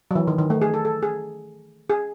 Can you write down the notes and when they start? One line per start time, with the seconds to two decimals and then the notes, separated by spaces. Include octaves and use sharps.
0.11 F#3
0.15 E3
0.27 D#3
0.39 D#3
0.50 A3
0.62 G#4
0.74 A4
0.85 A4
1.03 G#4
1.90 G#4